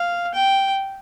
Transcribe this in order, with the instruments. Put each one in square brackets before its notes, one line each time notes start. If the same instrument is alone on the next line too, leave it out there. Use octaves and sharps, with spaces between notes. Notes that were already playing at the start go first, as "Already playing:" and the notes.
Already playing: [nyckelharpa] F5
G5